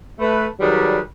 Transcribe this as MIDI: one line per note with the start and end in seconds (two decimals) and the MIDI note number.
0.19 0.45 57
0.19 0.45 71
0.60 0.99 51
0.60 0.99 54
0.60 0.99 55
0.60 0.99 68
0.60 0.99 71
0.60 0.99 74